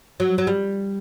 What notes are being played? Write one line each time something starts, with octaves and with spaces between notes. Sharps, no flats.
F#3
F#3
G3